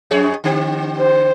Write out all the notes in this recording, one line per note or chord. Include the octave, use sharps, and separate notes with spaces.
F2 G#4 C#5
D3 C4 G4
C5